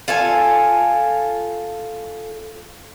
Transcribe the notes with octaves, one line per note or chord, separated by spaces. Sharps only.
F4 A4 G#5